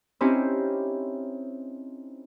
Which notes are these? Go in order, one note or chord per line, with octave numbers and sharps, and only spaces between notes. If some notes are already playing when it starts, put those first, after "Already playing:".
C4 C#4 D#4 E4 G4 C5